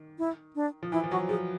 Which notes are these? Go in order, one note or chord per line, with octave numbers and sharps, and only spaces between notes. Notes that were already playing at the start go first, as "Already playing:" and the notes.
Already playing: D#3
E4
D4
F3
E3 E4
F3
F#3 F#4
F3 G#4